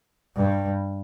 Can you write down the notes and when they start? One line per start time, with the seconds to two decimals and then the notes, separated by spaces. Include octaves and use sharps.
0.36 G2